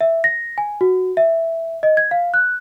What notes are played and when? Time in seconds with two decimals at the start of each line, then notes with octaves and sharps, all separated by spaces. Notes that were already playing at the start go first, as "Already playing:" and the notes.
0.01 E5
0.24 A#6
0.58 G#5
0.81 F#4
1.17 E5
1.83 D#5
1.97 G#6
2.11 F5
2.34 F#6